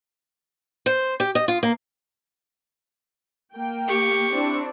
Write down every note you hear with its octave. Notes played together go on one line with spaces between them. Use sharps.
C5
G4
D#5
F4
A#3
A#3 G5
G4 C#6
C4 D4 E4